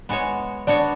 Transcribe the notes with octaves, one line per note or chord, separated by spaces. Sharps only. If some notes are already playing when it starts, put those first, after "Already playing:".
G#3 B3 F#4 C#5
B3 D4 F#4 C#5 D5